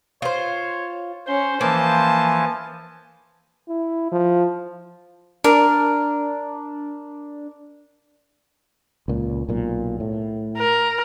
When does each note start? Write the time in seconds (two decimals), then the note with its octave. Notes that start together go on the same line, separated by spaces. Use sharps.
0.22 F4 C5 C#5
1.28 C#4 C5 C6
1.61 E3 F3 A#3 G#5 A5
3.68 E4
4.12 F3
5.44 D4 A#4
9.08 C#2 A#2
9.49 B1 A#2
10.00 A2
10.57 A#4